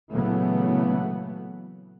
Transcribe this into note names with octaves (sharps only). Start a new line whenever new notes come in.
A#2 C#3 E3 F#3 A3 B3